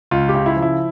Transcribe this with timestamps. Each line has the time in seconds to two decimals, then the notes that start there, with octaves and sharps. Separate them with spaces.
0.11 C#2 F4
0.29 G4
0.34 C#3
0.46 E4
0.56 F3
0.62 E4